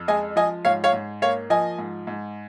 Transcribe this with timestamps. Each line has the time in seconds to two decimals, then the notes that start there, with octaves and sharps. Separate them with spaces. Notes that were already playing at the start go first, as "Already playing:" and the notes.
Already playing: F2
0.08 G#3 D#5 G#5
0.36 F3 D#5 G#5
0.65 G#2 C#5 F5
0.84 C#5 F5
0.93 G#2
1.22 A#3 C#5 F5
1.50 F3 D#5 G#5
1.78 G#2
2.07 G#2